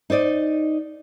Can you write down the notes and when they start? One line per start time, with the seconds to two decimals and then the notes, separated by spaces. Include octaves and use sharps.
0.10 D#4 C5 D5 D#5